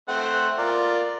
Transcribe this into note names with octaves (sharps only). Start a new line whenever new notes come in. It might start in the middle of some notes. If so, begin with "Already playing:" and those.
A3 C4 F#5
F4 A#4 D5